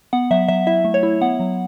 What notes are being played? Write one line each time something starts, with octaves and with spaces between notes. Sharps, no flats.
B3 F#5
F#3 E5
F#3 E5
E4 E5
A3
C#5
E4
B3 F#5
F#3